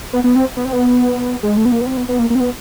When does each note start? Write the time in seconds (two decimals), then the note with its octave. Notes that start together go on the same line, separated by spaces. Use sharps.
0.13 B3
0.24 B3
0.36 C4
0.57 B3
0.65 C4
0.73 B3
1.43 G#3
1.57 A3
1.65 B3
1.72 A#3
1.81 B3
1.86 C4
1.97 B3
2.09 B3
2.19 A#3
2.30 A#3
2.35 C4
2.40 B3